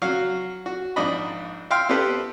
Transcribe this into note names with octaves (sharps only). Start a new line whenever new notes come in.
F#3 F#4 F5
F#4
A#1 G#2 D4 D5 D#5 B5
E5 F5 G5 C6 F6
B3 C4 G4 A4 B4